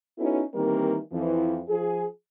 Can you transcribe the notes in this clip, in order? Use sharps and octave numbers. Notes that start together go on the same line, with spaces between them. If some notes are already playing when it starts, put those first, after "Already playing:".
B3 C#4 D#4 E4 F#4 A4
D#3 E3 G3 A#3 C4 A#4
F2 E3
F3 G#4